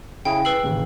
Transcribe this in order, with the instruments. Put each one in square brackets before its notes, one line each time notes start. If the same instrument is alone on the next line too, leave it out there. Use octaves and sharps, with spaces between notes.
[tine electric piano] C#3 E4 G#4 [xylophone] G5
[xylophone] B4 E6 F#7 [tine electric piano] C7
[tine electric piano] A1 D#2 C#3